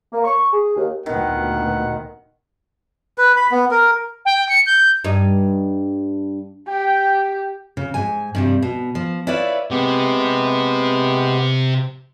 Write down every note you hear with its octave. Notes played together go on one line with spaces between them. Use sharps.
A#3
C#6
G#4
D#2
D2 A#2 D#3 B3 F#5
B4
B5
B3
A#4
G5
C#7
G6
G2 D#4
G4 G5
C#3
G#2 G#5
G2 C3 G3
B2
F3
E4 F4 B4 C#5 D5 E5
C3 G#3 B3 G4